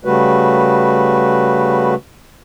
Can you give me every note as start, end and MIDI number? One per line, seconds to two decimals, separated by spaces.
0.05 1.95 49
0.05 1.95 55
0.05 1.95 57
0.05 1.95 66
0.05 1.95 71